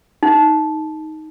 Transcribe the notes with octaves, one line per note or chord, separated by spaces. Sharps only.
D#4